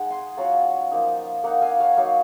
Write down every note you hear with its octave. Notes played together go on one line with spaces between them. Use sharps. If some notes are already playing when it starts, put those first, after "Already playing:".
Already playing: G#3 D#4 F#5
G#5 C6
F#3 C#4 F4 F#5 A#5
F3 A#3 D#4
A#3 D#4 F#5 A#5
F5 G#5
F#5
C#5 F5
F#3 A#3 D#4 C#5 F5